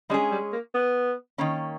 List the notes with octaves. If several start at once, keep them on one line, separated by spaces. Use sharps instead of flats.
G3 G#3 C#4 G#4
G3
A#3
B3
D#3 A#3 C#4